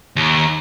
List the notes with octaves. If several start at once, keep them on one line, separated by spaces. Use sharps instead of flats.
D#2